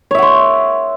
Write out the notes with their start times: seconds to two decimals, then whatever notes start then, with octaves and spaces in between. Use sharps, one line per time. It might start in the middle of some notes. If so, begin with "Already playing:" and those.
0.11 C#5
0.15 E5
0.18 F#5
0.22 C6